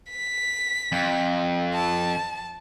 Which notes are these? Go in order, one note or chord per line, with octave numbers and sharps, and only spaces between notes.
B6
F2
A5